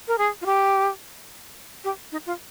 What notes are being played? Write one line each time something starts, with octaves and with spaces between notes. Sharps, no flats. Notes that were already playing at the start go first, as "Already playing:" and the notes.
A#4
G#4
F4
G4
G4
D#4
F4